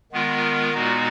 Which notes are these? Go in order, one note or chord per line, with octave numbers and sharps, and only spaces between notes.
D#3 G#3 B3 F4 A#4
A#2 G#3 B3 D#4 F#4